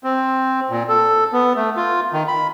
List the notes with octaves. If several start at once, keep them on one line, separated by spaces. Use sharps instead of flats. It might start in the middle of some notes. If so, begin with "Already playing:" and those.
C4
A#2
A4
B3
A3
F4
D#3
B5